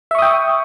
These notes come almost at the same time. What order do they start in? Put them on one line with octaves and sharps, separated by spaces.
E5 C#6 D#6 G5